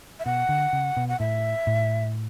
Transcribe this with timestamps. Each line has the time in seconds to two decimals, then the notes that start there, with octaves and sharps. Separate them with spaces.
0.20 E5
0.26 B2 F#5
0.49 D3
0.73 C#3
0.97 B2
1.09 F#5
1.20 A2 E5
1.67 A2